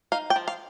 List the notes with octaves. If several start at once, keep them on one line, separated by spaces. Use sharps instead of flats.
D#4 F5
G5
F3
F5